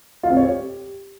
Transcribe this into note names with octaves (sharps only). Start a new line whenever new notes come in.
F4
C4
C#5
G4